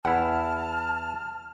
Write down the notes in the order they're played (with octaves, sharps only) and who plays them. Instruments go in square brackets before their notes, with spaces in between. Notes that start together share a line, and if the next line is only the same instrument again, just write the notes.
[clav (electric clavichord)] E2 E4 [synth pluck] F#5 [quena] A5 [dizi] F6